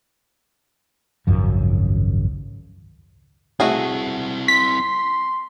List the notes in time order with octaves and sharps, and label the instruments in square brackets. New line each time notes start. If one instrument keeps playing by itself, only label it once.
[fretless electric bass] G#1 C#2 F#2 F3
[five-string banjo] A3 F#4 G#4 [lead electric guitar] C4 E4
[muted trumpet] C6 [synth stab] B6